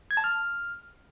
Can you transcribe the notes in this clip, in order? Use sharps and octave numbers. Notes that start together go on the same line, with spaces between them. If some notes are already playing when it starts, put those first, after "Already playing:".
G#6
A5
F6